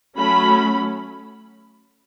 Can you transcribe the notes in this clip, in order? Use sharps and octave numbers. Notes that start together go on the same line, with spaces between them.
F#3 A3 C#4 B5